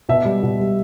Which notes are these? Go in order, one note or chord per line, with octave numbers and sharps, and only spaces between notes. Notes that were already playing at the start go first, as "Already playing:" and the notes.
B2 E5
G3
B2
G3